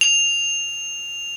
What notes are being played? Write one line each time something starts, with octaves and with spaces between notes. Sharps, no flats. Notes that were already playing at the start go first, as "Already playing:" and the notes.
F7